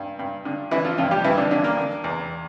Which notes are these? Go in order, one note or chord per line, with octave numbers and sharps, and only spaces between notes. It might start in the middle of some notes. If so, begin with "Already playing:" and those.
Already playing: G2
G2
D3
D3 E3 E4
F3 F4
G2 F3 F4
G3 G4
G2 E3 E4
D3 D4
D3 D4
A#3 A#4
D3
E2